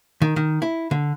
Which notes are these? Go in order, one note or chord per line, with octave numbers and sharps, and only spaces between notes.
D#3
D#3
E4
D3